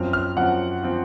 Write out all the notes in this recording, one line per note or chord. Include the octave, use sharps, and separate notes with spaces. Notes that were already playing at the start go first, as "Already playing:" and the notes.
Already playing: F#2 F3 C4 F6
F6
F#2 F3 C4 F#5
F3 C4